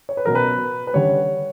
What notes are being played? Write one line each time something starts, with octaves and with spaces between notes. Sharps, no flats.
C#5
B4
B2 F#3 C#4 A#4
B4
B4
D3 G3 C#4 C#5